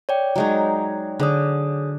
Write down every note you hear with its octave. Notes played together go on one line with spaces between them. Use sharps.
C#5 D5 G5
F#3 G#3 D#4
D3 G#4 C#5 D#6